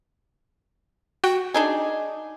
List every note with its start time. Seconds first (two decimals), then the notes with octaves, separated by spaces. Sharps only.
1.24 F#4 G5
1.54 D4 D#4 G#4